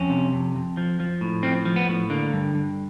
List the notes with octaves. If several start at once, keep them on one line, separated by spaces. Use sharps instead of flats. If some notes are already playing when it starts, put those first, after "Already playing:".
Already playing: F2 C#4
C3
F2
F2
F3
F3
A2
F3 C4
F3
B3
A2
D3 A#3
G2
G2